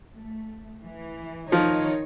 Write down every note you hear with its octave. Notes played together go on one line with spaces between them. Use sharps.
A3
E3
D#3 F3 D#4 C#5